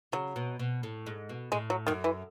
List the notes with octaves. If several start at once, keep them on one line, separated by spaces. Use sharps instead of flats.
C#3 F#3
B2
B2
A2
G#2
B2
A2 G#3
F#3
F#2 D#3
E3